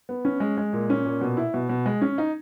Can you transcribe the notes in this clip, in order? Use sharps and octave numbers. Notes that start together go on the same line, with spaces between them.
B3
C#4
G#3
G#3
A#2
C#4
A#2
B2
E4
B2
B2
G#3
C#4
D#4